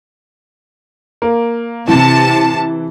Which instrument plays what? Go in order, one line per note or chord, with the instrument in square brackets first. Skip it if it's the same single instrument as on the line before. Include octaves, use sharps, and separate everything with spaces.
[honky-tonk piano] A#3
[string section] C3 A5 [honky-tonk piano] E3